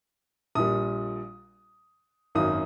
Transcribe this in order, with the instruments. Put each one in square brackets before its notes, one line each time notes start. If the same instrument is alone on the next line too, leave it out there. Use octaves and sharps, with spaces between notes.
[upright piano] A#1 A#2 G3 D#6
G#1 F#2 D#3 F#3 D#6